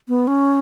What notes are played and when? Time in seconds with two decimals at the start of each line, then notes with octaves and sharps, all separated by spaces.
0.08 B3
0.27 C#4